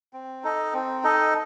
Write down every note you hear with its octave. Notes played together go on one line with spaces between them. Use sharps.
C4
D#4 A4 D#5
C4
D#4 A4 D#5